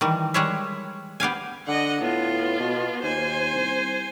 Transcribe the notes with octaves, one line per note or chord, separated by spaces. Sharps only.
D#3 E3 G3
G3 G#3 G#4 C#5 E5
B3 G4 F5 G#5
D3 D#5 F#5
A2 B3 F4
B2
D#2 C5 G#5
C2